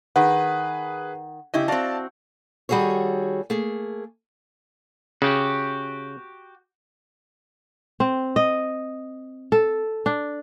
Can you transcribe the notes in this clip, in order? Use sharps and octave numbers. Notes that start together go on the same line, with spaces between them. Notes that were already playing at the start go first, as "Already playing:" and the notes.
D#3 G#4 B4 F#5
C#3 E4 G4 D#5
C4 F#4 D5 F5 A5
D#3 G3 F#4 G#4 A4 C#5
A3 A#3 G#4
C#3 F#4 G4
C4
D#5
A4
D4